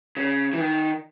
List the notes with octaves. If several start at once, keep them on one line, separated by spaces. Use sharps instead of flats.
C#3
E3
D#3